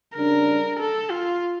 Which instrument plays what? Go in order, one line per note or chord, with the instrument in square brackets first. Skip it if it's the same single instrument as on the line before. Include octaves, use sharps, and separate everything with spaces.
[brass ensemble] C#3 G3 D4 [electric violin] A#4
[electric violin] A4
F4